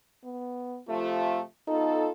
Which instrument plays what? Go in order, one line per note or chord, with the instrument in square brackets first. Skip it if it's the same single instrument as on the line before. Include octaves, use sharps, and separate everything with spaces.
[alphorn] B3
[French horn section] C3 F3 A3 [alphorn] F4
[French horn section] B3 F4 A4 [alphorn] D#4